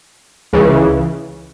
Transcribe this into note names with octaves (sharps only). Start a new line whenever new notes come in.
C#2 C#3 E3